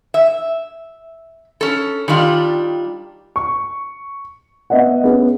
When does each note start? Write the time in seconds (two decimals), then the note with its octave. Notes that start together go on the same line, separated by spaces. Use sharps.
0.14 E5
1.61 C#4 A4
2.08 D#3 G3 D4 F4
3.36 C#6
4.70 B3 D#5 E5 F#5
5.04 B3 C#4 G#4